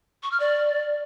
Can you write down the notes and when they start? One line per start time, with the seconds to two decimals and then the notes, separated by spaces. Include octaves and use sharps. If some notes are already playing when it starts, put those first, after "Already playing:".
0.23 C#6
0.31 F6
0.40 D5